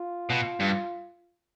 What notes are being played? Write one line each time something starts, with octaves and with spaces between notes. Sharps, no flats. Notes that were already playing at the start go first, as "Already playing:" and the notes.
Already playing: F4
B2
G2